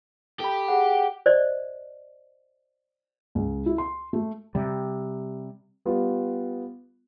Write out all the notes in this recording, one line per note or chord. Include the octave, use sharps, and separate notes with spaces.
G4 A4 B5
G#4 F#5
C5 D5 D#5
C#2
E4
C6
A3
C3 G3
G3 B3 F4